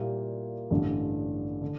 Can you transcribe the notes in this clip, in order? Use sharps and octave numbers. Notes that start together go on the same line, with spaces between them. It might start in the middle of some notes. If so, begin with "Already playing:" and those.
Already playing: A#2 G3 A#3 E4 G4
A1 G2 D3 G3
D3